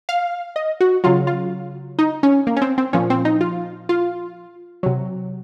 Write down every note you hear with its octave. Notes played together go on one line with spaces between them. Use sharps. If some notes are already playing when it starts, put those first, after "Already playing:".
F5
D#5
F#4
C#3 F#3 F4
F4
D#4
C#4
A#3
C#4
C4
C4
A#2 F3 C#4
C4
D#4
F4
F4
C3 F#3